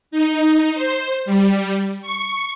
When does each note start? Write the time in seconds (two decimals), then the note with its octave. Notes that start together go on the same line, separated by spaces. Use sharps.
0.11 D#4
0.74 C5
1.25 G3
2.02 C#6